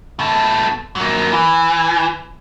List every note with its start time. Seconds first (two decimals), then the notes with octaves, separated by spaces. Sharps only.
0.19 B2 A4
0.96 F#3 A#3
1.32 E3